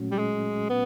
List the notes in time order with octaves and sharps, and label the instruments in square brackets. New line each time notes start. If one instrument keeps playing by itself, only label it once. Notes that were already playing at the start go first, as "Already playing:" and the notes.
Already playing: [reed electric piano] A#2 F#3 A3 C#4 F#4
[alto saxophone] G3
G#3
B3